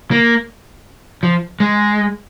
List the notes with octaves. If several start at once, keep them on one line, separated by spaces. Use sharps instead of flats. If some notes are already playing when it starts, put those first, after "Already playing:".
A#3
F3
G#3